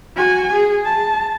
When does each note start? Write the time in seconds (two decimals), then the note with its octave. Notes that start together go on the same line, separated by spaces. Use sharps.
0.16 F#4 G#5
0.54 G#4
0.85 A5